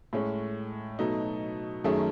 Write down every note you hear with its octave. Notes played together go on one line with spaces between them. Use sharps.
A2 G#3 C#4
B2 F#3 A3 D#4
F#2 D#3 A3 C#4 G#4